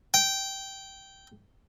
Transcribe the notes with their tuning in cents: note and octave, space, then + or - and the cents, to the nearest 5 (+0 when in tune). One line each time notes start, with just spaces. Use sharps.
G5 -10